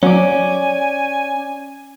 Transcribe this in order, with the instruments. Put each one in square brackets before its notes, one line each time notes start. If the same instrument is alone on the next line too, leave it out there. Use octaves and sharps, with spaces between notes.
[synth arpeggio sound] F#3 [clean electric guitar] C#4 D5 [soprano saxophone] G#5